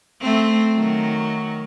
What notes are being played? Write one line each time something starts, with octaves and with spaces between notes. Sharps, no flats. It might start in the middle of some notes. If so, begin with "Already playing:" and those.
A3 C4
D#3 F#3